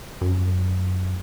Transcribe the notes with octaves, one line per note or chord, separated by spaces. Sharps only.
F#2